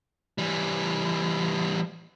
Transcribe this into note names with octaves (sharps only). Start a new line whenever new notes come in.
E3 G3